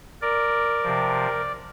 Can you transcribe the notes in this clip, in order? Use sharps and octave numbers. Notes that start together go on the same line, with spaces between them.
A#4 D5
C3 F3